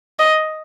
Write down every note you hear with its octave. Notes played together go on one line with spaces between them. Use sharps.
D#5